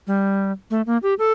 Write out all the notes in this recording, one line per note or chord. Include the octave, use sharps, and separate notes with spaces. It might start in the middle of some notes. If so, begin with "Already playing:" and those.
G3
A3
A#3
G4
A4